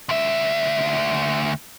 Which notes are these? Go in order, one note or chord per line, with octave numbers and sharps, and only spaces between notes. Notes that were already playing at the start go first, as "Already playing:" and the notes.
D2 E5